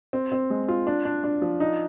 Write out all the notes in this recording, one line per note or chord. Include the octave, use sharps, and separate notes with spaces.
C4
C4
G#3
F4
D4
D4
D4
F3
D#4